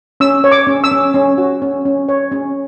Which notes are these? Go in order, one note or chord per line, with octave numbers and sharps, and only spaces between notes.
C#4 E6
C#5
D6
C#4
E6
C#4
C#4
F#4
C#4
C#4
C#5
C#4